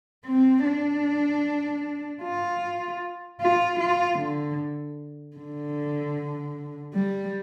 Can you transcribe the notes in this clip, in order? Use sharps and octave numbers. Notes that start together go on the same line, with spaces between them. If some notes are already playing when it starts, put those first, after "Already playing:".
C4
D4
F4
F4
F4
D3
D3
G3